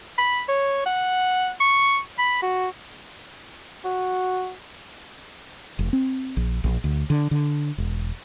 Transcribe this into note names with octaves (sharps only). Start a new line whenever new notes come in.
B5
C#5
F#5
C#6
B5
F#4
F#4
F1
C4
A#1
A#1
D2
D3
D3
E1